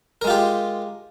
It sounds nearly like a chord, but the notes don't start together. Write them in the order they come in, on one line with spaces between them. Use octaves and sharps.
A#4 G#3 F4 G4